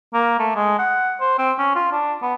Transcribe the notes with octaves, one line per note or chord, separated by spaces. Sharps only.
A#3
A3
G#3
F#5
C5
C4
C#4
F4
D4
B3